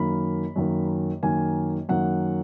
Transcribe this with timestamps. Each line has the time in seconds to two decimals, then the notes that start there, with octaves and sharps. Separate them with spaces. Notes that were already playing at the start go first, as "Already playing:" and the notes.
Already playing: F#2 D#3 A#3 B5
0.56 F#2 D#3 A#3
1.22 F#2 D#3 A#3 G#5
1.89 F#2 D#3 A#3 F#5